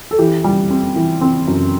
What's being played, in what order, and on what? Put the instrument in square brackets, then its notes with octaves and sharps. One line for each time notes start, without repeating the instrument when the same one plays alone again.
[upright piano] A4
E3 G4
G3
C4
E3
C4
F#2